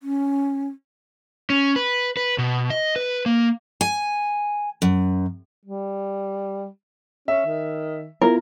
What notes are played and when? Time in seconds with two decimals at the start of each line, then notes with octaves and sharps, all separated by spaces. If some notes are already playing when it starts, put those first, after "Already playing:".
0.03 C#4
1.50 C#4
1.76 B4
2.17 B4
2.38 B2
2.70 D#5
2.96 B4
3.26 A#3
3.81 G#5
4.82 F#2
5.65 G3
7.28 C#4 E5
7.46 D#3
8.21 B3 E4 F4 A#4